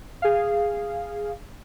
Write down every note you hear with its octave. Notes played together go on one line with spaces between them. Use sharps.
G#4 F5